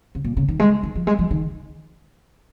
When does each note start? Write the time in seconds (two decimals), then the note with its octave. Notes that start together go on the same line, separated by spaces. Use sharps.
0.15 C#3
0.25 A#2
0.37 C#3
0.48 D#3
0.59 G#3
0.83 D#3
0.95 F3
1.07 G#3
1.19 F3
1.31 D#3